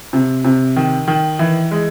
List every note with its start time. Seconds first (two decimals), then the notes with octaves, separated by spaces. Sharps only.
0.13 C3
0.44 C3
0.76 D#3
1.08 D#3
1.39 E3
1.71 G#3